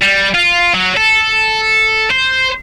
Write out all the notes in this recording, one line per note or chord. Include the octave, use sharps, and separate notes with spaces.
G3
F4
F#3
A4
C5